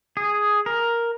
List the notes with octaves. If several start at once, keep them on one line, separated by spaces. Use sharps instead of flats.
G#4
A#4